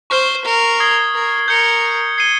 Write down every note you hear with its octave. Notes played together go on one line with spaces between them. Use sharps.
C5 C#6 F6 C7 G7
A#4
D#6 G#6 C7 G7
A#4
A#4 G6 C#7 G7
G#6 C7 D#7 G7